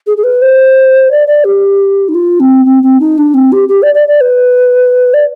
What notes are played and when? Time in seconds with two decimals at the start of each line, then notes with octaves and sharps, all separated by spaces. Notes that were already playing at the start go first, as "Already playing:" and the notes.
0.07 G#4
0.17 G#4
0.24 B4
0.42 C5
1.11 D5
1.27 D5
1.44 G4
2.09 D#4
2.15 F4
2.40 C4
2.65 C4
2.83 C4
3.00 D#4
3.18 D4
3.34 C4
3.52 G4
3.69 G4
3.82 D5
3.94 D5
4.08 D5
4.21 B4
5.14 D5